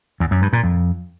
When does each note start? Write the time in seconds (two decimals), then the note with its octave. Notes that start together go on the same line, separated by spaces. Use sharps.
0.20 E2
0.31 F#2
0.42 G2
0.53 A#2
0.64 F2